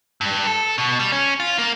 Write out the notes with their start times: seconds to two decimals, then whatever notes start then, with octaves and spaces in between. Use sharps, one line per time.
0.21 G2
0.47 A4
0.78 B2
0.99 G3
1.12 C#4
1.40 F4
1.58 A#3